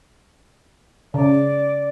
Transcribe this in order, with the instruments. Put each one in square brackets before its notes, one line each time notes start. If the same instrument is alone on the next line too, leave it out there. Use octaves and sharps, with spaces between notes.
[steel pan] C#3 [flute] D5